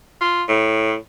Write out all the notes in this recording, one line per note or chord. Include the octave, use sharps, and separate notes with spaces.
F4
A2